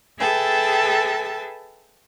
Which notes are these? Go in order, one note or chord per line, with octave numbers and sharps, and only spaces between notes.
G#4 A4 B4 E5 G5 A5